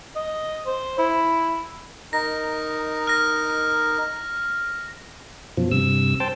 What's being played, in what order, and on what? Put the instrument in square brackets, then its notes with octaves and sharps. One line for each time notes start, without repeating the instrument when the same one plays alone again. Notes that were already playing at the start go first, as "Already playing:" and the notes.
[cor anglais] D#5
C5
E4
[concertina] D#4 A#4 [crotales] A#6
[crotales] F6 A#6
[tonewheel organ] F#2 B2 F3
G2 C3 E6
C5 G5 A5